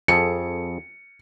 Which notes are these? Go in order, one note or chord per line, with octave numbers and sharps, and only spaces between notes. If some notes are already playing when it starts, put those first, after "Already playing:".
F2 G#4 A4 C#7